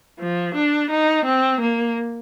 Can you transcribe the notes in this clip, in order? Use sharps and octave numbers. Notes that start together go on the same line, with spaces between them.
F3
D4
D#4
C4
A#3